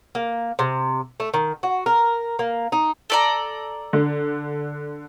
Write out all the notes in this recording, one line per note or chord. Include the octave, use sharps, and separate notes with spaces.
A#3
C3
A3
D#3
F#4
A#4
A#3
D#4
A4 D5 A#5
D3